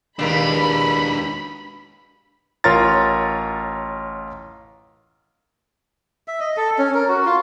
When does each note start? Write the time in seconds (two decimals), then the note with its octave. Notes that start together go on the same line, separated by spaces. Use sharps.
0.19 D#2 B2 G#3 A#3 D4 B5
2.64 A1 F4 A#4 C#5 A#5 A6
6.28 E5
6.40 D#5
6.57 A4
6.78 C#4
6.94 A#4
7.08 F#4
7.26 F4